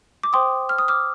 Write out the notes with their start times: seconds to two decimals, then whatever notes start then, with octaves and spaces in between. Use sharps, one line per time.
0.23 D6
0.33 C5 G5 C6 D#6
0.69 F6
0.78 D#6
0.88 D6 F6